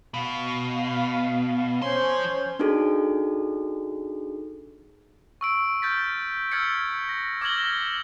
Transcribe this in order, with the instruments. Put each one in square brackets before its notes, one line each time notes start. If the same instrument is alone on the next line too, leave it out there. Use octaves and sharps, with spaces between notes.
[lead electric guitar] B2 [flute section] F5
[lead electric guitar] F3 C6 [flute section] C#4 C5 C#5
[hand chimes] D4 D#4 F#4 G#4 A4
[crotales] C#6 E6 D7
F6 G6 A6 B6
E6 F6 G#6 A6 B6 C#7
A#6
D6 F6 G#6 A#6 F#7 G7